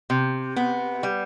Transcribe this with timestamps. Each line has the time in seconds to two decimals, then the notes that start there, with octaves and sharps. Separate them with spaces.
0.10 C3
0.56 B3
1.03 G3